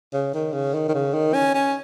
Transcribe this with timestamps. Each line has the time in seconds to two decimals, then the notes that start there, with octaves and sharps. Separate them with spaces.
0.13 C#3
0.34 D#3
0.53 C#3
0.74 D#3
0.89 D#3
0.94 C#3
1.13 D#3
1.34 C#4
1.54 C#4